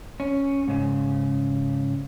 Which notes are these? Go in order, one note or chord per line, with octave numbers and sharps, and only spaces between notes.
C#4
G#2 C#3